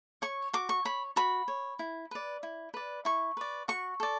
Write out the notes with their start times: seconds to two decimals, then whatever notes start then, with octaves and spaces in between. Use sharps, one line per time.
0.22 C#5 C#6
0.53 F#4 D6
0.69 C#6
0.85 C#5 B5
1.16 F#4 B5
1.48 C#5
1.79 E4
2.11 B4 D5
2.43 E4
2.74 B4 D5
3.05 E4 C#6
3.37 B4 D5
3.68 F#4 C#6
4.00 A4 D5